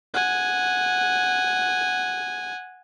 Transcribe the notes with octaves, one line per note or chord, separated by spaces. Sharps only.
F#5 G#5